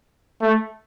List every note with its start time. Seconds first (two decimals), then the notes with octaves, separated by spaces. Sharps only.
0.42 A3